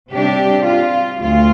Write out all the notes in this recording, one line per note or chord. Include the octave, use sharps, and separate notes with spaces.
C3 G3 D4 G4
F4
D2 F4